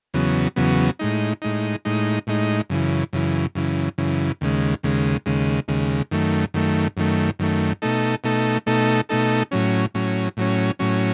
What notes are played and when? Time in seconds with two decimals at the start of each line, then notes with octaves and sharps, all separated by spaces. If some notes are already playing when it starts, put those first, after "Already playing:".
0.14 E2 C#3 F#3 B3
0.56 E2 C#3 F#3 B3
0.99 A2 G#3 D#4
1.42 A2 G#3 D#4
1.85 A2 G#3 D#4
2.27 A2 G#3 D#4
2.69 F#2 C#3 E3
3.13 F#2 C#3 E3
3.55 F#2 C#3 E3
3.98 F#2 C#3 E3
4.41 D#2 C#3 G#3
4.83 D#2 C#3 G#3
5.26 D#2 C#3 G#3
5.68 D#2 C#3 G#3
6.11 F#2 D#3 A3
6.54 F#2 D#3 A3
6.97 F#2 D#3 A3
7.39 F#2 D#3 A3
7.82 B2 A3 D#4 A4
8.24 B2 A3 D#4 A4
8.66 B2 A3 D#4 A4
9.09 B2 A3 D#4 A4
9.51 A2 F#3 C#4
9.94 A2 F#3 C#4
10.37 A2 F#3 C#4
10.79 A2 F#3 C#4